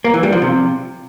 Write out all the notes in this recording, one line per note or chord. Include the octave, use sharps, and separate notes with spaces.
A#3
E3
G3
F3
C3